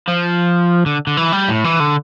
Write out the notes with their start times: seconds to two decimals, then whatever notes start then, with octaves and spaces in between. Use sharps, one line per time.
0.08 F3
0.86 D3
1.07 D3
1.17 E3
1.32 G3
1.48 A2
1.64 E3
1.80 D3